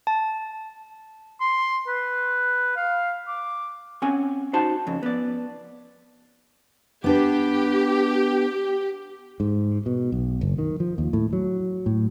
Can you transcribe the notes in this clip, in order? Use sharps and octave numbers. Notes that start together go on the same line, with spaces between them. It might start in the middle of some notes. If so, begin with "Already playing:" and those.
A5
C6
B4
F5
D6
C4 C#4 F#5 G#5
D#4 F#4 C5 A5
F2 C#3
B3 D5
B3 D4 G4 B4
G#2
B2
B1
F#1
D#3
F3
D#2
A2
F#3
A2